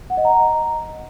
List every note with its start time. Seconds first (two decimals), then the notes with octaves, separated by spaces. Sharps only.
0.10 F#5
0.17 D#5
0.25 A#5